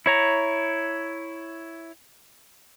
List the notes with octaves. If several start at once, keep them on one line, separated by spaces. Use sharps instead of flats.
E4 C#5 A#5